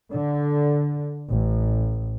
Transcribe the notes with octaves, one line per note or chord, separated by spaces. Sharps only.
D3
A1